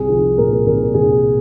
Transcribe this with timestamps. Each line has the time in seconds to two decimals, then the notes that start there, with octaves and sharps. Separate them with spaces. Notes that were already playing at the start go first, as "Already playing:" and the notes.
Already playing: C2 G#4
0.09 F3
0.38 A#2 A#4
0.66 C2 A#4
0.94 C2 G#4